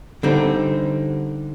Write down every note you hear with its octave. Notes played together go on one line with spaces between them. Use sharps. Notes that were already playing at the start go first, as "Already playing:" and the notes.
D3 G3 C4 D#4